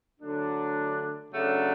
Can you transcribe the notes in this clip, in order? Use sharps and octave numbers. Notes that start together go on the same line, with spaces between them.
D3 F#3 A3 D4
C#3 F#3 A3 D4